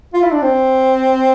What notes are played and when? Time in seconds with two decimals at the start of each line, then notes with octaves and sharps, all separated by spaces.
0.14 F4
0.22 E4
0.32 D4
0.42 C4